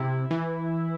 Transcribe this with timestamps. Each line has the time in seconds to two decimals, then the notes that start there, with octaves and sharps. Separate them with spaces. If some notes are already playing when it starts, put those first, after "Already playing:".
Already playing: C3 E4
0.31 E3